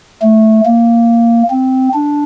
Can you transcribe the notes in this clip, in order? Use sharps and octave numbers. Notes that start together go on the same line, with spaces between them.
A3
A#3
C4
D4